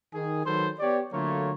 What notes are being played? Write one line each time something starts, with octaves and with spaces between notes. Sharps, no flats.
D#3 G#4
D#3 F#3 A4 B4 C5
B3 G4 C#5 D5
D3 F#3 A3 A#3 F4 C#5